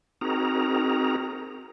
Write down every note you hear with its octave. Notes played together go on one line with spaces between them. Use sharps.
C4 D#4 F#4 G#4 A#4 A#5